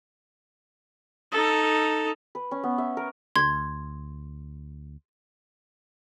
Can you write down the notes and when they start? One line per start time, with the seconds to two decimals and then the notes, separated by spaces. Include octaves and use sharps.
1.31 D#4 A4
2.35 B4
2.51 C#4
2.63 B3
2.78 E5
2.97 A#4
3.36 D2 C6 G#6